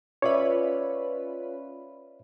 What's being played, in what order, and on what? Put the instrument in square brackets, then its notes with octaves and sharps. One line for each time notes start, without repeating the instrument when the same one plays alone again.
[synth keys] C#4 F4 B4 [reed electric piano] C#5 D5 E5